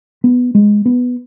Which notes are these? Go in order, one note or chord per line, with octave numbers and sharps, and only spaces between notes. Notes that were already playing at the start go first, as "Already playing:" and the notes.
B3
G#3
B3